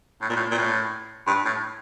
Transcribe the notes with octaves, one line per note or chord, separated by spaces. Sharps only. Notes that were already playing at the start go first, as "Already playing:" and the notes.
A2
A#2
A2
A#2
A2
G2
A2